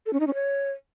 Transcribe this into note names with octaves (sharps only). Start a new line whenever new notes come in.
A4
C#4
D#4
C#4
C#5